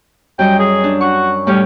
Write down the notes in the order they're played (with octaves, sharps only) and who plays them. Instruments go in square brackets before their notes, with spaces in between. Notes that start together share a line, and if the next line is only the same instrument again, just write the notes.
[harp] F#2 G3 D#5 [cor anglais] G5
[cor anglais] G#4
[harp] D4
[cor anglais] F#4 [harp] C#6
[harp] A2 G3 G4 [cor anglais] C#4